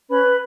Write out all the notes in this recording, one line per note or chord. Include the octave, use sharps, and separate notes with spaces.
C#4 B4 B5